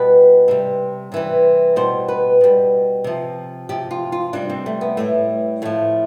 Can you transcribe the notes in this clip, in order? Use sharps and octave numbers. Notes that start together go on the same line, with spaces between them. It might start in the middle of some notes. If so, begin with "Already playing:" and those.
Already playing: B2 G3 B4
C3 G3
C3 E3 G3
B2 G3 C5
B4
B2 G3
C3 F3
C3 F3 G4
F4
F4
C3 G3 D4
C4
A3
B3
A2 G3 A3
A2 F3 A3